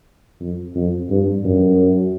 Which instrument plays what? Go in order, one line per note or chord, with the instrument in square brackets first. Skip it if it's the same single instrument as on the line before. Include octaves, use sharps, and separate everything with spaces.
[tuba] F2
F2
G2
F#2